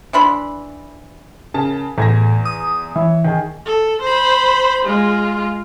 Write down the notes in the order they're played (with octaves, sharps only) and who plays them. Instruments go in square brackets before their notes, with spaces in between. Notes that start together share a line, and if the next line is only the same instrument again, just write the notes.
[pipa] E3 D4 B5 C6
[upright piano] C#3 A#4 A5
[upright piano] E2 G#6 A#6 [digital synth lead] A2
[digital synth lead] D#6
[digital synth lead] E3 [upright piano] E4 C#5
[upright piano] D#3 G#4
[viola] A4
C5 B5
G#3 F4